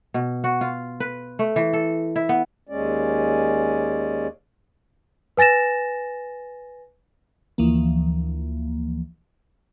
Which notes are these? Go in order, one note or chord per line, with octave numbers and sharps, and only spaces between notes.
B2
F#4
F4
B4
A3
E3
A4
E4
B3
D#2 G#3 C#4 D5
B4 G#5 A6 A#6 E7
D2 E3 F3 A#3